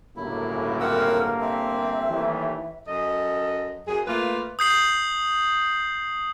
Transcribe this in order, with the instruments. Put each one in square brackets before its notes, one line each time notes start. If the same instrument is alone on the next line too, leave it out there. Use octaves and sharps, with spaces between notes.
[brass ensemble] G1 A#3 [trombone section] C#2 F#2 A2 [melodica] E4
[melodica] C4 F#5 E6 [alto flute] A#4
[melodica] C4 [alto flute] E5
[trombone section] D#2 [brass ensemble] E3 G3 A3
[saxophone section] F#2 A4 D#5
F#2 G#4
A3 A#3 F4 B4
[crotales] D#6 G6 C7 F#7